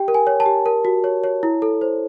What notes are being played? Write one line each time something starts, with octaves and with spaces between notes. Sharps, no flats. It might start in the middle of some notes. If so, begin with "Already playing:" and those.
Already playing: G4 G5
A#4
G#5
C#5
A5
G4
A#4
F#4
C#5
C#5
E4
A4
C5